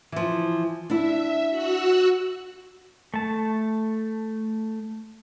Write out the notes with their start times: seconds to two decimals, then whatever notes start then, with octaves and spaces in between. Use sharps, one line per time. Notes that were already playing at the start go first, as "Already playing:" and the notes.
0.12 E3 F3
0.90 D4 E4 E5
1.50 F#4 E6 F#6
3.14 A3 A5